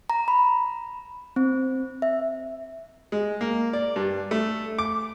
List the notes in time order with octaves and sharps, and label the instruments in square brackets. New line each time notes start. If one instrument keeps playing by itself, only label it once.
[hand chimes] A#5
B5
C4
E5
[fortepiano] G#3
A#3
D5
G2
A3
D6